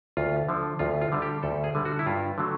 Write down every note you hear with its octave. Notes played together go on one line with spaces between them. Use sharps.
D2 F4
D3 F3
D2 F4
F4
D3 G3
G4
D2 A4
G#4
D3 G3
F#4
E4
G2 F4
D3 F#3 A3